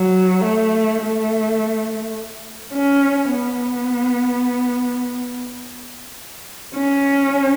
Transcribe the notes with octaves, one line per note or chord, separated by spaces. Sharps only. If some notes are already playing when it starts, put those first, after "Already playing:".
Already playing: F#3
A3
A3
C#4
B3
C#4